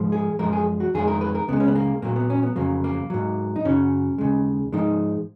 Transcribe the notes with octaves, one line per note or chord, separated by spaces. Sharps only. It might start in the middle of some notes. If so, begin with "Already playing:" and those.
Already playing: G#2 F3 G#3
G#4
F#2 F3 G#3 A#4
G#4
F#4
F2 D#3 G#3 G#4
A#4
B4
A#4
C#2 C#3 G#3 B3
C#4
B3
A#3
A#2 F#3 A#3
B3
C#4
B3
F2 C#3 F#3 A#3
A#3
G#2 F#3
D#4
F#2 C#3 F#3 C#4
D#2 C#3 G#3
G#2 F3 G#3 D#4